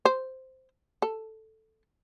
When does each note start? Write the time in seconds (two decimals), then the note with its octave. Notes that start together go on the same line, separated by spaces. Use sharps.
0.05 C5
1.02 A4